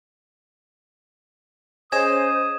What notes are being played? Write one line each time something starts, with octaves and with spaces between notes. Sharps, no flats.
C#4 G#4 C5 D#5 D#6 G#6 E7